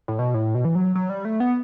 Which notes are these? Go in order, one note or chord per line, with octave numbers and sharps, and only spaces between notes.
A2
B2
A2
B2
E3
F#3
F#3
G3
A3
B3